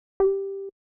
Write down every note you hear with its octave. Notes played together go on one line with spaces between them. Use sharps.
G4